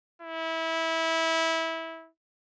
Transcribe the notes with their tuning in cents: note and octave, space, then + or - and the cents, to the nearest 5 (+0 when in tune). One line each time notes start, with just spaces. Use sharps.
E4 -20